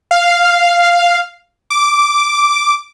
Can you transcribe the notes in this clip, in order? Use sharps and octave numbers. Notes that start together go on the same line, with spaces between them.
F5
D6